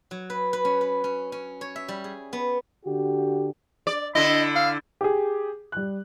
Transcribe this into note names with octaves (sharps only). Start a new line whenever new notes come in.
F#3
B4
B4
C#4
B4
C#4
C#4
C#5
E5
G3
G#4
B3
D3 F#4 G4
D5
D3 E4 D#5
F5
G4 G#4
G3 F#6